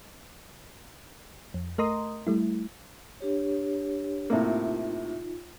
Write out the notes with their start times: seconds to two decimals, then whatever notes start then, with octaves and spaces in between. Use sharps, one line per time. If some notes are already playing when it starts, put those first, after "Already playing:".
1.54 F2
1.78 A3 A#4 D#5 A#5 C6 D#6
2.27 G3 A3 E4
3.20 D4 G4 C#5
4.30 A2 C3 A#3 D#4 F4